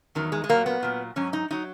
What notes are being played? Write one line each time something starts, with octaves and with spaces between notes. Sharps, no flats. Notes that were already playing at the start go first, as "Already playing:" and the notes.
E2 D#3 F#3
G#3
G#3
A#2 F#3 A#3
B3
A#2 F#3
G#2 F#3 C#4
D#4
F#3 D#4